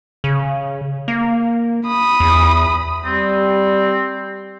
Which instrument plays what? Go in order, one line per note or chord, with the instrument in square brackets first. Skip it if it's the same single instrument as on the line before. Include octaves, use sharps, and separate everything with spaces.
[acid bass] C#3
A#3
[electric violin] B5 D#6
[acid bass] E2
[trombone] G3 [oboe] C4